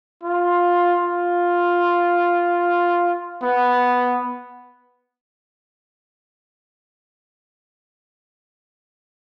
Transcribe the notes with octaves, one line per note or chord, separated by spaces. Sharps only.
F4
F4
B3